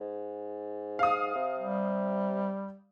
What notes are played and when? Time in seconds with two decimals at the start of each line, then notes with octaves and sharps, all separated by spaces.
0.01 G#2
0.99 F5 D#6
1.35 C3
1.59 G3